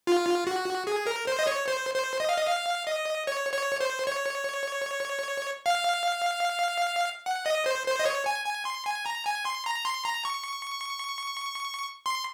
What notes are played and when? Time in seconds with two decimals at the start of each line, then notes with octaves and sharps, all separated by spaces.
0.07 F4
0.47 F#4
0.87 G#4
1.07 A#4
1.27 C5
1.39 D#5
1.47 C#5
1.68 C5
1.94 C5
2.20 D#5
2.29 F5
2.37 D#5
2.47 F5
2.87 D#5
3.27 C#5
3.53 C#5
3.81 C5
4.07 C#5
5.66 F5
7.26 F#5
7.46 D#5
7.66 C5
7.87 C5
7.99 D#5
8.06 C#5
8.26 G#5
8.45 G#5
8.65 C6
8.86 G#5
9.06 A#5
9.26 G#5
9.45 C6
9.66 A#5
9.85 C6
10.05 A#5
10.25 C#6
12.06 C6